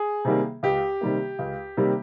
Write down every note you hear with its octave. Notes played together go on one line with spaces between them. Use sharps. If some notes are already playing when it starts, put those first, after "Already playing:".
Already playing: G#4
C3 D#3 G3 A#3
C#2 G4
C3 D#3 G3 A#3
C#2
C3 D#3 G3 A#3